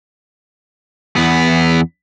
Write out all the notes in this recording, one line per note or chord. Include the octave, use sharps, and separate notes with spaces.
E2 B3